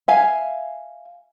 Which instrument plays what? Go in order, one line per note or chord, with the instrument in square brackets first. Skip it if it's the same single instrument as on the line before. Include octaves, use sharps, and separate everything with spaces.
[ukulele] E5 F5 G#5